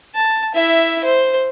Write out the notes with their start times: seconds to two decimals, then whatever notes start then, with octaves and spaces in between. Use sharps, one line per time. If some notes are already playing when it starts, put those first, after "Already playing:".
0.15 A5
0.54 E4 E5
1.04 C5